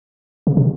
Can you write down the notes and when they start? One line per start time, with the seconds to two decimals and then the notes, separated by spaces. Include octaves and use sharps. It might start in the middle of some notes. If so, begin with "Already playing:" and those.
0.47 C#3
0.57 C3